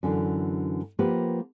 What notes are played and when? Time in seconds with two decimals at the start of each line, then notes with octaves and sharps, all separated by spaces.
0.03 F#2 D3 E3
0.99 F3 A#3 B3 G4 B4